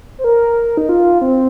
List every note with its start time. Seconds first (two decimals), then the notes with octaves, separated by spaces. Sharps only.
0.18 C5
0.24 A#4
0.77 D#4
0.89 F4
1.21 C4